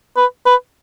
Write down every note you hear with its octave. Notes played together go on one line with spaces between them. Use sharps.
B4
B4